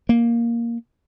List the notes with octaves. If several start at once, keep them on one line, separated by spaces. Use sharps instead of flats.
A#3